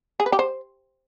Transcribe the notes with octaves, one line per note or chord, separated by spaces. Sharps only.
G#4
B4
G4
C5